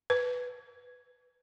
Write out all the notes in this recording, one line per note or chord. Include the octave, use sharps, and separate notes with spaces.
B4